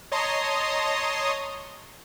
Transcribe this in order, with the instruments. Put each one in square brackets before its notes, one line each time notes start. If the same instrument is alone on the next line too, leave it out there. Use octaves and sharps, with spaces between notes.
[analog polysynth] C#5 D#5 A5 A#5 C6 D#6